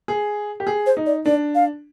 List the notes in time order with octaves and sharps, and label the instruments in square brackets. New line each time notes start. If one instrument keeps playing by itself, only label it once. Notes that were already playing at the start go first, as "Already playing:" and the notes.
[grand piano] G#4
G4
G#4
[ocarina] C5
[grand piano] D#4
[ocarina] D5
[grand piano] D4 [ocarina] D5
[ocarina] F5